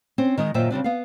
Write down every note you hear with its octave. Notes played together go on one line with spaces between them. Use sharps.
C4 C#4 C5
D#3 G#3 D#5
F#2 A#2 D#3 C5 E5 G5
C#3 G3 C4 D4
B3 F5